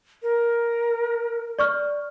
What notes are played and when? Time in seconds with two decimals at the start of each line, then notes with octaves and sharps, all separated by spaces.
0.23 A#4
1.59 D5 C#6 F6